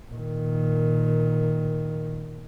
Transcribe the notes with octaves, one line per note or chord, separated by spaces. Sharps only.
A#2 D#3